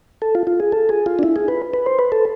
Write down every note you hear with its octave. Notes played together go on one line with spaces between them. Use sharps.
A4
F4
F4
G#4
A4
G#4
F4
D4
E4
G#4
B4
B4
C5
B4
A4